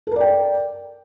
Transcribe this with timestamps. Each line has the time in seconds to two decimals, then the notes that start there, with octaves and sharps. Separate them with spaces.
0.07 A4
0.11 A#4
0.16 D5
0.21 G5